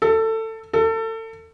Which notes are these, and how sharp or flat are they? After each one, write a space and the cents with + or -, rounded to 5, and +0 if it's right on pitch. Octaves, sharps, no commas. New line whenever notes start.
A4 +20
A4 +30